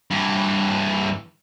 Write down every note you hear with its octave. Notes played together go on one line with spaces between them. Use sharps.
G2 E3